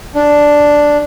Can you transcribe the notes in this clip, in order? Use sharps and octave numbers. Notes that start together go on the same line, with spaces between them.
D4